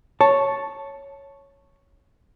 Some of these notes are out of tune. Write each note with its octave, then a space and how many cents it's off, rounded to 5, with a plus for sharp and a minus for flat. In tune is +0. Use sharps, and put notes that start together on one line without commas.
C#5 +0 A5 +0